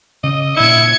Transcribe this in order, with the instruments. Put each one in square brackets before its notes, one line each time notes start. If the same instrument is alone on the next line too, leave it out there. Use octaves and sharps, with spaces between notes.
[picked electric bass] C#3 [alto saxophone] D#5
[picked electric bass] A#2 D4 [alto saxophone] E4 [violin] G#6 C#7